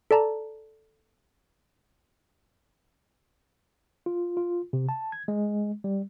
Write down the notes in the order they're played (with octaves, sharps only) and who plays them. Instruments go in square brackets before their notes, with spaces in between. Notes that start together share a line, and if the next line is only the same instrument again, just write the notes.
[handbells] A4 D5 A5 A#5
[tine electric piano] F4
F4
C3
A5
G#6
G#3
G3